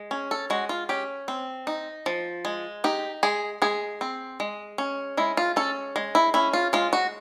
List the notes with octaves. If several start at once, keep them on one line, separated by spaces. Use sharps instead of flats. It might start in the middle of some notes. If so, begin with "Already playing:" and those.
Already playing: G#3
C#4
A4
G#3 F#4
F4
C#4 G4
C4
D#4
F3
G#3
D#4 G4
G#3 G#4
G#3 G#4
C4
G#3
C#4
G#3 E4
F4
C#4 A4
G#3
E4
C#4 E4
F4
G#3 F4
F#4